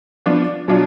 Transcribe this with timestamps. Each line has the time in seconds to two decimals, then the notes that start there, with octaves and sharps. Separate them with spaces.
0.26 F3 B3 D4 F4
0.68 B2 F#3 D4 F4